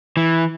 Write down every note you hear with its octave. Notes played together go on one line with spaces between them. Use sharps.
E3